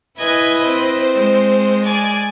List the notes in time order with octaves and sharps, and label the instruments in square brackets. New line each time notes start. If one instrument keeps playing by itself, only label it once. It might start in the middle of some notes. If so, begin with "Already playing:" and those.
[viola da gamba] E4 B4 D#5 [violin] G#5 G#6
[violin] C4 C5
[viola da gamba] G#3
[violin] D5 G#5